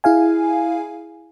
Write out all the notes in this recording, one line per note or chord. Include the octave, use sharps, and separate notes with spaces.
E4 G#4 F5 G#5